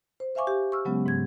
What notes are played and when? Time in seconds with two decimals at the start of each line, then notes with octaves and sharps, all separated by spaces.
0.20 C5
0.35 C5 E5 F5 G#5 C#6 D6
0.47 G4
0.72 C#6 E6 F6
0.85 C#3 F#3 G#3 B3 C#4
1.06 G#2 C#3 G#6